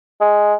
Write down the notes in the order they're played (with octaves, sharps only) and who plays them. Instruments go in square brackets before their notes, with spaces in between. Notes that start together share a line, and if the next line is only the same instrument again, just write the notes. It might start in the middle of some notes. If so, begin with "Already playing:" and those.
[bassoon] G#3